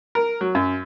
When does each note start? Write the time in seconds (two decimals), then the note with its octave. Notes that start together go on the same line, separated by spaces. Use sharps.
0.15 A#4
0.41 F#3
0.55 F#2